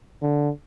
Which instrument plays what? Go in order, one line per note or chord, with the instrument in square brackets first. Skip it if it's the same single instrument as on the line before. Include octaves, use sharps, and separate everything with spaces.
[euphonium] D3